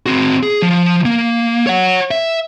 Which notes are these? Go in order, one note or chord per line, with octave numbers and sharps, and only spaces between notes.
C4 F#4
G#4
F3
A#3
C#5 F#5
E5